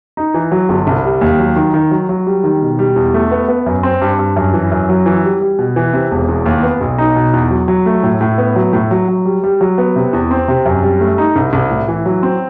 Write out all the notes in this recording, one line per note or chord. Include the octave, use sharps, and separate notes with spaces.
D#4
E3
F#3
G1
C2
G3
D#2
F#3
D#3
D#3
F#3
F#3
G3
D#3
B2
G3
E2
A3
B3
B3
F#2
C4
G2
G2
F#2
E3
F#2
F#3
E3
G3
G3
B2
E3
C3
E1
E2
D#2
B3
B1
D#4
B2
E2
F#3
F#3
A3
A2
A2
B3
F#3
A2
F#3
F#3
G3
G3
F#3
B3
C3
E2
C4
C3
F#2
G3
A3
D#4
C2
C2
A2
E3
F#3
C4